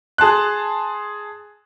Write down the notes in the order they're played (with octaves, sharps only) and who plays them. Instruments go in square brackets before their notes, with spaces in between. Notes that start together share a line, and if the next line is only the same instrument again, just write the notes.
[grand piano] G#4 A5 C6 F#6